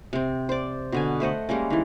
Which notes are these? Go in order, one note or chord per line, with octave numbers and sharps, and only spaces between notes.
C3 C4
C5 D5
B2 D3 G#5
A3 C5 D#5 F#5
G3 G#3 A#3 C#4
D#3 E3